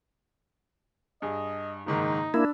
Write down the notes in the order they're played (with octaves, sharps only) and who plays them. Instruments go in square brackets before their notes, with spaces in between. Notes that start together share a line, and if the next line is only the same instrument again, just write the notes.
[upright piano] G2 G#4 [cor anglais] D#5
[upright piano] F#1 G#2 D#3 [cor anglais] D#4
[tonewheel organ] A#3 E4 [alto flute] D4 [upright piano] B5 E6